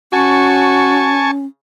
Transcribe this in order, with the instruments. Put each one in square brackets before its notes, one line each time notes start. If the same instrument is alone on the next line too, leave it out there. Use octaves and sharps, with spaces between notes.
[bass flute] C#4 [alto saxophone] F#4 [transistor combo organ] G#5 A5 C#6